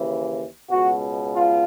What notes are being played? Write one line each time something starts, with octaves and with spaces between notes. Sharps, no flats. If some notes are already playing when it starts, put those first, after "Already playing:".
Already playing: D#2 C#3 E3
C#2 B2 F#4
F4